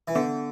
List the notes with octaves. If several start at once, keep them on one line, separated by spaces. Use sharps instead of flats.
E3
D3 B3